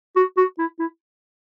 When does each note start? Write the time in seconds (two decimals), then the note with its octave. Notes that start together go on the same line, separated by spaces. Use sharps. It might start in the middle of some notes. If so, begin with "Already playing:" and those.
0.16 F#4
0.37 F#4
0.58 E4
0.79 E4